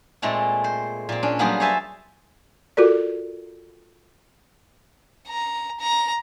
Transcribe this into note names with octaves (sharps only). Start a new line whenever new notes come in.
A#2 G#3 A3 C4
C5
A#2 C4
C#4 D4
F#3 G3 A#3 B3 G#4 C5
C5 C#5 E5 G#5 A5 B5
F4 F#4 A4 A#4 D5
A#5
A#5